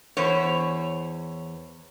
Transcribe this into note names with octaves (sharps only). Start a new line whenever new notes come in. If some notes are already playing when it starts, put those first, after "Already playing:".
E2 C5 C#5